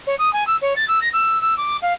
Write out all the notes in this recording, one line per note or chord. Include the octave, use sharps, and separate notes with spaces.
C#5
D#6
G#5
E6
C#5
A6
E6
A#6
E6
E6
D6
F5